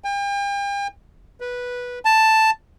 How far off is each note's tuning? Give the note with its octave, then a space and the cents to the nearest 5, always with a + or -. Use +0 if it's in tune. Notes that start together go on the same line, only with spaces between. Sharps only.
G5 +40
B4 -10
A5 +5